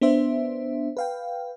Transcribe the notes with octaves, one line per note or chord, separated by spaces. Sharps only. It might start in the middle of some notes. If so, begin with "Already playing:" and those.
B3 D4 C5 E5
B4 F5 G5